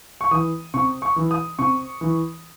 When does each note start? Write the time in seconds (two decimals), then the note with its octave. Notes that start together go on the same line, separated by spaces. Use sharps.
0.21 C#6
0.31 E3 D#6
0.74 C3 C#6
1.02 C#6
1.16 E3
1.31 D#6
1.59 C3 C#6
2.01 E3